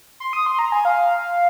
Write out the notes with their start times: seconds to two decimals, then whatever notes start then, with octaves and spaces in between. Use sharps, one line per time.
0.20 C6
0.33 D#6
0.46 C6
0.59 A#5
0.72 G#5
0.85 F5